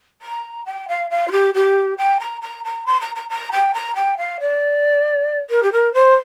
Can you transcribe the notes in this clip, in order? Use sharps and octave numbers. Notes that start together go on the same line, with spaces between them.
A#5
G5
F5
F5
F4
G4
G4
G5
A#5
A#5
A#5
C6
A#5
A#5
A#5
G5
A#5
G5
F5
D5
A#4
G4
A#4
C5